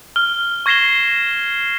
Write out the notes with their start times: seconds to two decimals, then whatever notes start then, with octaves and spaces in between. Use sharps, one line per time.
0.16 F6 G7
0.66 C#6 G#6 A#6 C7 E7 G7